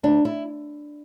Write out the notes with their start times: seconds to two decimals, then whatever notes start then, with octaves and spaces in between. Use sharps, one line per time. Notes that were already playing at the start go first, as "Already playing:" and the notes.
0.03 D2 D4
0.25 E4